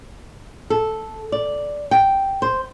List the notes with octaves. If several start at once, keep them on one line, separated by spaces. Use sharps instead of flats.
A4
D5
G5
C5